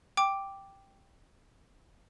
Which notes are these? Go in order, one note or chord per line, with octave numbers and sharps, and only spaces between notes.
G5 D6